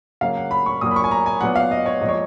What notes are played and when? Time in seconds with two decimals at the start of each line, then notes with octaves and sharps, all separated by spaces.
0.21 C#3 F#3 A#3 F5
0.37 F#5
0.51 B5
0.66 C#6
0.81 A#2 F#3 A#3 D#6
0.91 B5
0.96 C#6
1.04 G#5
1.11 A#5
1.26 G#5
1.41 A#2 F#3 B3 F#5
1.56 F5
1.71 D#5
1.86 C#5
2.01 A#2 F3 G#3 D#5
2.09 C#5